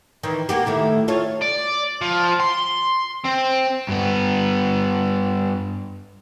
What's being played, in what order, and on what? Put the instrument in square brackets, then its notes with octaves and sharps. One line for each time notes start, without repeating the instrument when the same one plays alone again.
[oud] D#3 E3
A#3 F#4 G4
D#3 A3 E4
F4 A4 C#5
[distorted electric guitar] D5
F3
C6
C4
[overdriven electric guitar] G2 B3